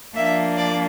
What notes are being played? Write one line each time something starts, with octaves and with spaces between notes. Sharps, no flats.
F3 A#3 D4 E5
D5